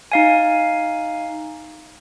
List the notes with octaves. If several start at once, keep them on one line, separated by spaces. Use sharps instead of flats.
D#4 F5 G#5